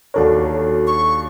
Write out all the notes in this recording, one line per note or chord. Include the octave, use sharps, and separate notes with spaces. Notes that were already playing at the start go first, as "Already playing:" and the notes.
D#2 D4 F#4 A4 A#4 C#5
C#6